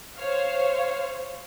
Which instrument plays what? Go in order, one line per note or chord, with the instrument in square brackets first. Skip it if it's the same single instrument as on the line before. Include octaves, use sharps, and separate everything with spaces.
[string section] C5 C#5 F5